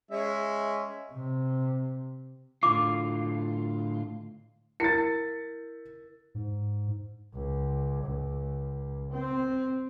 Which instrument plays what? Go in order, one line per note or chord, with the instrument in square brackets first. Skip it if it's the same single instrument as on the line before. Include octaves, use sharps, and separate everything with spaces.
[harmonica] G#3 C#4 E5
[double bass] C3
[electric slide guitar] A2 D3 F4 [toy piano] D6
[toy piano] E4 [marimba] A#4 [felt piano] A6 C#7
[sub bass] G#2
[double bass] C#2
C#2
C4